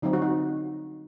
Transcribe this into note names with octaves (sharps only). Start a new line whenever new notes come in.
D3 F#3 C4 D#4
F#4
D#4